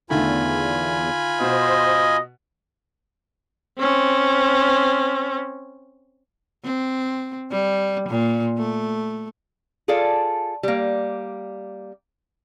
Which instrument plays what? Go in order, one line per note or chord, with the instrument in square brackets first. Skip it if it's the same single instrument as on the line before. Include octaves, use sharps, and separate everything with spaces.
[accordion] E2 [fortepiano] D3 D#3 A3 [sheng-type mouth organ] F4 G#5 B5
[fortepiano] B2 [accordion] C5 [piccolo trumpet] D#5
[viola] C4 C#4
[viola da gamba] C4
G3
A#2
A3
[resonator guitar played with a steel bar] F4 G#4 A4 D5 F5
G3 A#3